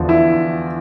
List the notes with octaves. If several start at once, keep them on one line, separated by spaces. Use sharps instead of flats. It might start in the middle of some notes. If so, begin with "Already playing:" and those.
Already playing: E2 D3 F3
E4